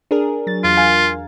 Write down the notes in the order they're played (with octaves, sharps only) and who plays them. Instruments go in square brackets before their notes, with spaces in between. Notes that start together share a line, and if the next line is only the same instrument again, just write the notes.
[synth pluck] D4 G#4 A#4
F#3 A6
[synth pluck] E2 [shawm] F4
[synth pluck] A#4 F5 G#5